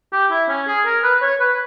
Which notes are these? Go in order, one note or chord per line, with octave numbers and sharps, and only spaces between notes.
G4
E4
C#4
G#4
A#4
B4
C#5
B4